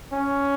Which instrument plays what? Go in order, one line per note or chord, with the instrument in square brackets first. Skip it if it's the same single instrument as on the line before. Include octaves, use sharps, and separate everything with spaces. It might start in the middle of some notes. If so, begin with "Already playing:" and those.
[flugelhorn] C#4